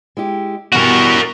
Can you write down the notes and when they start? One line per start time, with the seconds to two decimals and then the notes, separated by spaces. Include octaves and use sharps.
0.17 G#3 E4 G4
0.72 B2 E3 G3 F#4 A#4